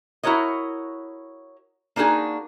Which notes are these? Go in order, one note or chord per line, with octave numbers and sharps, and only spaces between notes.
E4 F#4 A#4 C#5 D#5
A#3 D4 D#4 F#4 G#4